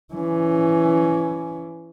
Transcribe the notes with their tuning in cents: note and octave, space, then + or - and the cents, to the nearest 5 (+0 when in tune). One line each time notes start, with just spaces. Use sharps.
E3 +20 C#4 +20